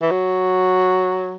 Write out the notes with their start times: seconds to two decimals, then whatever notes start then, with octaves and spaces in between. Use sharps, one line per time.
0.02 E3
0.10 F#3